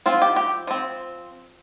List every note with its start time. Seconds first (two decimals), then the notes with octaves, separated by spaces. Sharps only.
0.06 F3 C4 F4
0.22 G4
0.36 G4
0.67 F3 C4